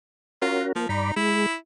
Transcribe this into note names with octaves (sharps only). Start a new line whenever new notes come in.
C#4 F4 F#4 A#4
F3 A#3
G2 D#4 D5 B5
G#3 E4